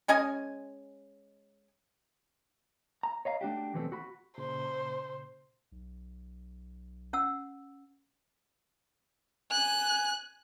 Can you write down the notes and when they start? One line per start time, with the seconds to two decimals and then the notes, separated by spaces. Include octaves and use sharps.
0.08 G#3 C#4 D#5 G#5
3.03 A#5
3.25 C#5 D#5 F5 A#5
3.41 A3 D4 F#4 G4
3.73 D#2 B2 E3 F3 A3 C4
3.92 F#4 B5
4.38 A#2 C#3 C5
5.72 B1
7.13 C#4 F#5 E6
9.51 G#5 F#6